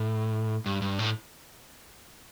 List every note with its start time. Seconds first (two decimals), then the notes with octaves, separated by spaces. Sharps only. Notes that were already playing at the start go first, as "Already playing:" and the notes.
Already playing: A2
0.66 G2
0.82 G2
0.99 A2